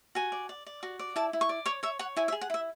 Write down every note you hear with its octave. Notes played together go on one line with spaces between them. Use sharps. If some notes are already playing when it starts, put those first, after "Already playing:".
F#4 G#5
D5
D5
D5
F#4
D5
E4 A5
E4
C#6
D5
C#5 C#6
C#5 E5
C#5 F#5
E4 G#5
E5
G#4
F#5
E4 E5